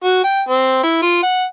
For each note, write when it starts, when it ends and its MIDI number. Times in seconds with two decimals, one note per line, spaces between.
0.04 0.23 66
0.24 0.40 79
0.49 0.81 60
0.83 1.00 64
1.02 1.18 65
1.23 1.44 78